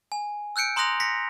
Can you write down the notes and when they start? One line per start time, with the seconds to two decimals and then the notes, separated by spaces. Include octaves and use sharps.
0.12 G#5
0.56 E6 F#6 G6 C#7 D7
0.76 A#5 C6 D#6 F#6 A#6 F7
1.00 A#6 B6 C#7